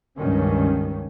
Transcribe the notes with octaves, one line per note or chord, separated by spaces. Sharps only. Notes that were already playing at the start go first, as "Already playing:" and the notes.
C#2 G2 D#3 C#4